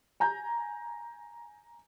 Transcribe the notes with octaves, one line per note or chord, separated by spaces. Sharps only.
G#5 A#5 G6